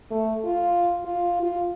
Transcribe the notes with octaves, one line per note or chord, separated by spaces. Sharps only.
A3
F4
F4
F4